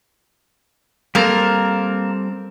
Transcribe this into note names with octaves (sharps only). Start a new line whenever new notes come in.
G3 A#3 C4 A4 A#4